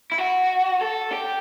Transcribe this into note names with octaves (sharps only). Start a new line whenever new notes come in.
E4
F#4
A4
G4